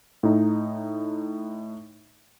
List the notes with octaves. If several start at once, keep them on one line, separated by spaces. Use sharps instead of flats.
A2 D#4